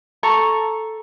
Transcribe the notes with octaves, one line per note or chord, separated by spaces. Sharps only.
A4 A#5 C#6